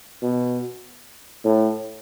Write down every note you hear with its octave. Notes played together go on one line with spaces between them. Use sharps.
B2
A2